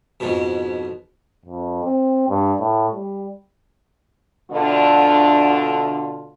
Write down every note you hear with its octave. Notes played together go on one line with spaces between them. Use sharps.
F2 G#2 B2
F2
C4
G2
A2
G3
D2 B2 D3 A3 D4 F4